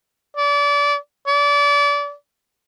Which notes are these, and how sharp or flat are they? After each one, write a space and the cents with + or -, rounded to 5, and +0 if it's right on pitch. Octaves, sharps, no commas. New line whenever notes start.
D5 -30
D5 -30